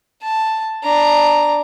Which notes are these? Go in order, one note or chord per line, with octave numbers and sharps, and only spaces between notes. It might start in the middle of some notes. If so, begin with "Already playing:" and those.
A5
D4 A#5